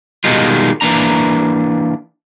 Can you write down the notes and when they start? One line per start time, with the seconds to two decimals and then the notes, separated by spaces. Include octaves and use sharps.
0.24 B2 D#3 G3 G#3 D#4 F4
0.81 E3 A#3 D4 A#5